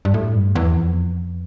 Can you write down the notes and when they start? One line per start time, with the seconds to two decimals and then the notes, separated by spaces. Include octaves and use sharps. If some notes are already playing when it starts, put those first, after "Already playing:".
0.05 G2
0.14 A2
0.35 G2
0.55 E2
0.76 F2